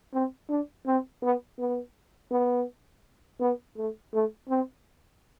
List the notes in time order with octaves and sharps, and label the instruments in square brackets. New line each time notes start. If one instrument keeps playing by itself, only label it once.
[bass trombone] C4
D4
C4
B3
B3
B3
B3
A3
A3
C4